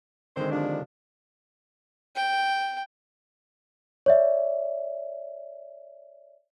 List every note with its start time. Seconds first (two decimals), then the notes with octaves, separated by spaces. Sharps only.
0.37 D3 D#3 G#3 C4 C5
0.51 C3 F3 D4
2.16 G5
4.06 C#5 D5 E5